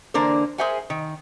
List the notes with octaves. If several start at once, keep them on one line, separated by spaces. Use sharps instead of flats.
D3 E3 A#3 D4 A#4 C5
G#4 A#4 C5 E5 F#5 G#5
D#3